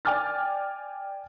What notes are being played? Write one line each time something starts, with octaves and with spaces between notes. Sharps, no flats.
D5 G5 G#5 D6 F6 A6